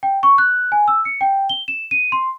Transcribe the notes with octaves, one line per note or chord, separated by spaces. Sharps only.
G5
C#6
F#6
G#5
E6
C#7
G5
G7
E7
D#7
C6